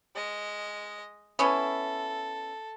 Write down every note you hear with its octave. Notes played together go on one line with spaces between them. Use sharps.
G#3 D#5
B3 C#4 E4 A4